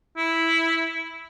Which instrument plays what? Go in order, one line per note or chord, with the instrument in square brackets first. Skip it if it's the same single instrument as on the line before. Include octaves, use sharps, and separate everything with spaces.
[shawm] E4